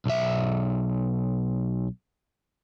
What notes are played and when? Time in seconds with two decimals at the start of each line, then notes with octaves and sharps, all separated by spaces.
0.06 B1 E5